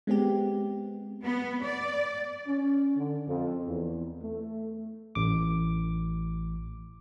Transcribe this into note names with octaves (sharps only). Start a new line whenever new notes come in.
G#3 B3 C4 G4
B3
D5
C#4
D3
F2
E2
A3
A1 D6